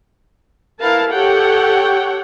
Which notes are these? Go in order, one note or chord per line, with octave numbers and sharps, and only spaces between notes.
E4 A#4 B4 F5 A5
G4 A4 C#5 F#5 G5